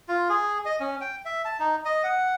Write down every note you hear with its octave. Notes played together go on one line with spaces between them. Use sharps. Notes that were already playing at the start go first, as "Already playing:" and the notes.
F4
G#4
D#5
C#4
G5
E5
A5
D#4
D#5
F#5